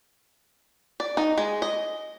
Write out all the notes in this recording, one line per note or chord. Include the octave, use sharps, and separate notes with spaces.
D5
D#4
G#3
D#5